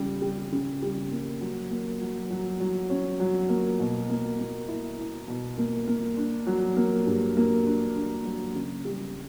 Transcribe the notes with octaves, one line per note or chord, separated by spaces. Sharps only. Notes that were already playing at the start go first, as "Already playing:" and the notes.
Already playing: C#3 G3
G3
C#3
G3
A#3
F#3
A#3
F#3
F#3
F#3
C#4
F#3
A#3
B2
A#3
A#3
E4
E4
B2
A#3
A#3
D4
F#3
A#3
G2
A#3
D4
D4
F#3
C#3
G3